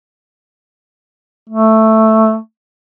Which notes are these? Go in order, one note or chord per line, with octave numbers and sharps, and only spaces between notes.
A3